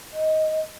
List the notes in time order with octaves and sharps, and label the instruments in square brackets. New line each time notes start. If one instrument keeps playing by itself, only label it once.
[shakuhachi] D#5